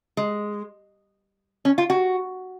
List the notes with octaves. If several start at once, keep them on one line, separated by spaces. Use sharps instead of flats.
G#3
C#4
F4
F#4